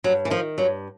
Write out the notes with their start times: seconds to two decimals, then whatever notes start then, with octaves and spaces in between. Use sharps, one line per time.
0.04 G2 F#3
0.25 E3
0.30 D#3 F3
0.58 G2 F#3